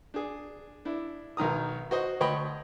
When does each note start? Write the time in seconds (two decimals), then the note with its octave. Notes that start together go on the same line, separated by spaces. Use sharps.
0.14 D4 G#4
0.85 D4 E4
1.37 B1 D#3 A#5 D#6
1.91 F#4 C5 D#5
2.20 D2 C#5 D#5 G5 B5